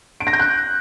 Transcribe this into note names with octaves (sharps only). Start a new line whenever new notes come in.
D7
A#6
G6
F#6